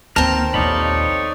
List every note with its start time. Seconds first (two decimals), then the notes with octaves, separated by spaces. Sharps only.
0.16 D2 D#3 A#3 C4 A5 A#5 F6
0.54 A#1 D#2 D#4 A4 C#5 D5 F5 B5